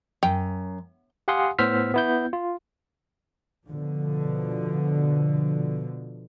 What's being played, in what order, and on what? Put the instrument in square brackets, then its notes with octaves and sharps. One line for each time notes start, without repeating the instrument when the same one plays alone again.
[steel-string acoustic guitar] F#2 [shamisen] G5
[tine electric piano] G4 F5 F#5 G#5 C6 D#6
A2 B3 C5 E6 F6 B6
B3 E4 G6
F4
[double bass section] B2 D3 F3